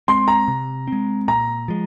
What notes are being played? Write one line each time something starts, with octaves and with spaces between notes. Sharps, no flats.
G#3 C4 C6
A#5
C3
G#3 C4
A#2 A#5
F3 G#3